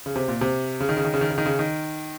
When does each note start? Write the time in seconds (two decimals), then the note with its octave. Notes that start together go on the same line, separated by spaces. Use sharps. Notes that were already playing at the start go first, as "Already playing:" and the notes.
0.06 C#3
0.16 C3
0.28 A#2
0.41 C3
0.80 C#3
0.89 D#3
0.97 C#3
1.04 D#3
1.14 C#3
1.21 D#3
1.30 C#3
1.38 D#3
1.46 C#3
1.59 D#3